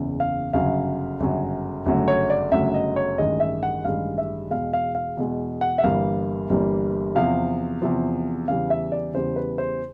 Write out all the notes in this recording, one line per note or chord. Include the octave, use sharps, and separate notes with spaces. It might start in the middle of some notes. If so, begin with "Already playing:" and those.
Already playing: F#1 E2 C#3
F5
G1 F#2 C#3 F#3 F5
G1 F#2 C#3 F#3
G1 F#2 C#3 F#3 A3
C#5
D5
G1 F#2 C#3 F#3 A3 E5
D#5
C#5
A1 G2 D#3 G#3 D#5
E5
F#5
A1 G2 D#3 G#3 F5
E5
E2 B2 G#3 F5
F5
F5
E2 B2 G#3
F#5
E5
G1 G2 E3 G3 A#3 F5
G1 G2 E3 G3 A#3
E2 C3 F3 F5
E2 C3 F3
E2 C#3 E3 G3 F5
E5
D5
E2 C#3 E3 G3 C5
B4
C5